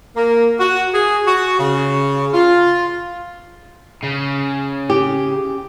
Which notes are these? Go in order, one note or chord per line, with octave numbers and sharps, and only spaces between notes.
A#3
F#4
G#4
F#4
C#3
F4
C#3
G4